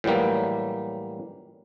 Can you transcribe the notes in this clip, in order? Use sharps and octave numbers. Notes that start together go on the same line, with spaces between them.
A2 E3 F#3 G3 A#3